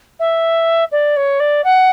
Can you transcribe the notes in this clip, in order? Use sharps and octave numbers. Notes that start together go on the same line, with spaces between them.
E5
D5
C#5
D5
F#5